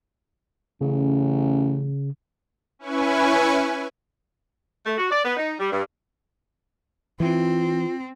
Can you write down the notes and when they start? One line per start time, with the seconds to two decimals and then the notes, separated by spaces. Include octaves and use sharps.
0.81 A1 C#3
2.79 C#4 E4 B4 G#5 C#6
4.86 A3
4.98 F#4
5.11 D5
5.24 B3
5.37 D#4
5.60 G3
5.72 G2
7.20 E3 C4 F4